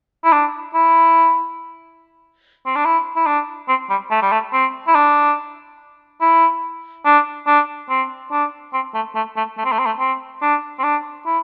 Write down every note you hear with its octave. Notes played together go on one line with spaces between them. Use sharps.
E4
D4
E4
C4
D4
E4
E4
D4
C4
G3
A3
G3
A3
C4
E4
D4
E4
D4
D4
C4
D4
C4
A3
A3
A3
A3
C4
A3
C4
A3
C4
D4
C4
D4
E4